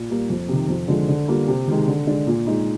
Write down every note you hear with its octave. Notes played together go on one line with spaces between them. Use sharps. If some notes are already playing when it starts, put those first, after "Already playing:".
Already playing: A#2
G3 A#3
F2
C3 D#3
F2
D3 F3 G#3
D3
G3 A#3 F4
C3
D#3 G#3
D3
G#3 D4
A#2
G#3 D#4